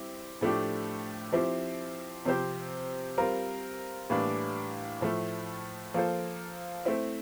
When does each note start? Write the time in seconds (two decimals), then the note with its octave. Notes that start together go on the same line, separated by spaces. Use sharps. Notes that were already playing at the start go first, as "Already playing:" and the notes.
Already playing: G3 C4 E4 G4
0.41 A2 F3 A3 D4 G4
1.33 F3 C4 E4 G4
2.25 C3 F3 C4 G4 C5
3.18 G3 C4 F4 A#4
4.10 A2 E3 G3 A#3 D4
5.01 A2 F3 A3
5.94 F3 A#3 F4 A4 C5
6.85 A3 C4 E4